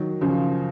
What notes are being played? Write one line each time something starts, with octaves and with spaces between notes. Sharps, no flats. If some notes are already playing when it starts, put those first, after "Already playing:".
Already playing: D#3 F#3
C#3 F3